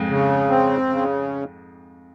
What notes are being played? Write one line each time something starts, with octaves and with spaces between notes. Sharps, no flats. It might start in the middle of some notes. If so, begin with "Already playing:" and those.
Already playing: F2 G#2
C#3
C4
C#3